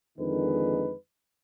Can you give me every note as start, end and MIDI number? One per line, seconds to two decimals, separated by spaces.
0.18 0.95 41
0.18 0.95 50
0.18 0.95 51
0.18 0.95 56
0.18 0.95 63
0.18 0.95 71